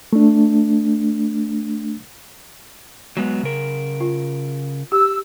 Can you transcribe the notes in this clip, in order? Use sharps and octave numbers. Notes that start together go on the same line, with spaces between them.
A3 D4
F#3 G#3 B3
C#3 A#4
F4
G4 E6